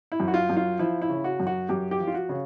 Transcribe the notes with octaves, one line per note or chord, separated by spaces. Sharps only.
E4
F#2
F#4
F4
F#2
F4
F3 E4
E4
C#3
F#4
F#2
F#4
F#2 G4
G4
F3
F4
F#4
C#3